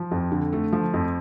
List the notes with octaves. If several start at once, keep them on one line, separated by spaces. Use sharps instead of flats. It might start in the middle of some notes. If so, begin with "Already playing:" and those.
Already playing: F3
F2
D3
A3
F3
F2